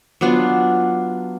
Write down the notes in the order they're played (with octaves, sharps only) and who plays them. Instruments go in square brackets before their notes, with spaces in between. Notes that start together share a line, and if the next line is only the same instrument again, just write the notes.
[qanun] F#3 B3 D4 F4